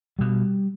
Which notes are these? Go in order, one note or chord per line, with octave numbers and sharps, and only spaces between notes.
B2 G3